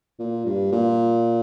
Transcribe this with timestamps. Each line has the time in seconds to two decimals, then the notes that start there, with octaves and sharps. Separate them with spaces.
0.19 A#2
0.46 G2
0.72 A#2